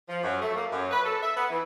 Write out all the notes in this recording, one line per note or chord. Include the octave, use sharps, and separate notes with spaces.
F3
F#2
A3
A#3
F#2
B4
A4
E5
B3
E3